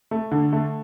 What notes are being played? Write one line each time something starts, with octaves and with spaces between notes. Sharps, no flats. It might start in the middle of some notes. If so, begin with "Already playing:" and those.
A3
D3
A3